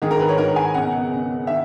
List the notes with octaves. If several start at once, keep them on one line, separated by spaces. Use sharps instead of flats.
G#2 D#3 G#4
A#4
B4
C#5
G#2 D#3 A#4
G#5
C#2 B2 F#5
C#2 B2
D#3 E5